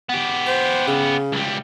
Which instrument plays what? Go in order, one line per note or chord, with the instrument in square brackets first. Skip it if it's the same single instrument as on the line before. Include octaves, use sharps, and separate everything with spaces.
[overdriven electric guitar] B3 G4
[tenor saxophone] C5
C#3
[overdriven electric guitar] C#2 G3